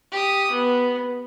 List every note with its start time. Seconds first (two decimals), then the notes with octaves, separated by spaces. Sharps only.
0.12 G4 D#6
0.51 B3